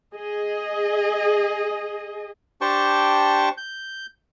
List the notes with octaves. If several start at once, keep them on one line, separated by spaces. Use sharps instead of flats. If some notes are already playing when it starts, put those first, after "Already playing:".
G#4 D#5
D4 G4 C5 G5 A5 C#6
G6